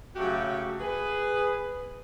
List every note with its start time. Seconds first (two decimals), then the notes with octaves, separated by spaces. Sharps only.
0.15 C#3 F#3 A3 F#4 G4
0.79 G#4 B4